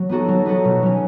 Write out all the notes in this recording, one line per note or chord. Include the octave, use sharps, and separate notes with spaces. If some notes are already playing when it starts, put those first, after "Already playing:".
Already playing: F#3
B3 D#4 F#4 A4
F#3
B3 D#4 F#4 A4
B2
F#3 C#4